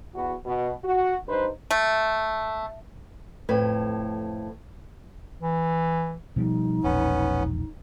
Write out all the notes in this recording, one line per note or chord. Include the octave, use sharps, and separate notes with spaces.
E2 B3 F#4
B2
F#4
G2 D#4 B4 C5
A3
F2 A2 B4
E3
B2 F3 G3 D#4
E1 A#1 B3 C#4